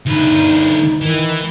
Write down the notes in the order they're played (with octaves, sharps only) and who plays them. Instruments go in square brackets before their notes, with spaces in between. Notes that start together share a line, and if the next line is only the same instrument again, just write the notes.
[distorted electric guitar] D2 B4 [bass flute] D#4
[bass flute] D#3 [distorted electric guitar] E3